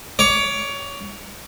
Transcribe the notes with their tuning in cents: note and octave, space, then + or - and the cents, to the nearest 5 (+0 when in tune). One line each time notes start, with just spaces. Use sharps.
C#5 +20 D6 +0